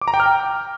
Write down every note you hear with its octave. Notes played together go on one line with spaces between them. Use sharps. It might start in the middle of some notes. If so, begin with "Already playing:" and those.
D6
A#5
G5
F6
G5